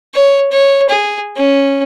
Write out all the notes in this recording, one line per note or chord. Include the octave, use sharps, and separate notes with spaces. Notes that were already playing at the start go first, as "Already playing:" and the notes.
C#5
C#5
G#4
C#4